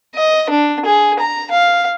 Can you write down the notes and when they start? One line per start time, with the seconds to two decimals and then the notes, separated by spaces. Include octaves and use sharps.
0.15 D#5
0.50 D4
0.85 G#4
1.19 A#5
1.51 F5